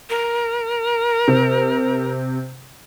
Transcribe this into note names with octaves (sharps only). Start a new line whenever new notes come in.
A#4
C3